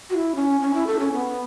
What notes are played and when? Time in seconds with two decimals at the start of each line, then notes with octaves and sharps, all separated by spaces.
0.10 F#4
0.15 E4
0.35 C#4
0.61 C#4
0.74 E4
0.87 A4
0.99 C#4
1.12 B3